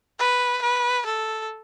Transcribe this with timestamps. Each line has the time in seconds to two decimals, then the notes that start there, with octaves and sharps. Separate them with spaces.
0.19 B4
0.62 B4
1.06 A4